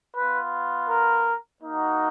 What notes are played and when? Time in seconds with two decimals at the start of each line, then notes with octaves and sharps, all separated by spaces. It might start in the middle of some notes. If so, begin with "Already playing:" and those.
0.16 B3 F4 B4
0.89 A#4
1.62 A#3 D#4 F#4